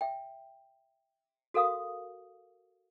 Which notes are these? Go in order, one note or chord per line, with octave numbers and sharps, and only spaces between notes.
E5 G5
F#4 A4 A#4 F5 D#6